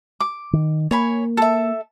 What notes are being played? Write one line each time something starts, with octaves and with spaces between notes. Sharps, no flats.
D6
D#3
A#3 C#5 G#5 B5
A4 E5